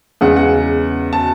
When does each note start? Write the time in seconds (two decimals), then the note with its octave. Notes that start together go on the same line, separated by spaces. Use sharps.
0.21 E2 C#3 G#3 F#5
0.36 F#5
1.13 A5